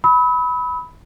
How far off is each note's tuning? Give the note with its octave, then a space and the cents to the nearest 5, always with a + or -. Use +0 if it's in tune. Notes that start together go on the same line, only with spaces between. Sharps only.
B5 +0 E6 -45